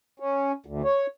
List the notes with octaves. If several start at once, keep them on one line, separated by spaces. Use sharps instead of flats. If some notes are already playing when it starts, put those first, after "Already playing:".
C#4
D2
C#5